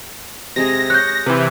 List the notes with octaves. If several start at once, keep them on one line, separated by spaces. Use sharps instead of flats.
C3 G#3 G#4 A#6
C#5 F#6 G6
C3 E3 B4